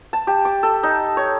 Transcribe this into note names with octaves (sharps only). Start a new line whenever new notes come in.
A5
G4
D6
A4
D#4
C#5